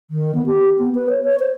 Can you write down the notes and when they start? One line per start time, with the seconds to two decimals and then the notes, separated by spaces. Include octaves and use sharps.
0.11 D#3
0.35 B3
0.46 G4
0.79 B3
0.95 B4
1.09 C#5
1.24 C#5
1.39 C5